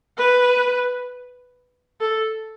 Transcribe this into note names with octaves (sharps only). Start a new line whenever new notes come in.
B4
A4